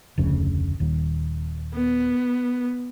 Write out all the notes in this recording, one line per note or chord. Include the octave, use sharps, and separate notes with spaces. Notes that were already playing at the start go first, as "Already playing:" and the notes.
F1 D2 C#3
D#1 D#2
B3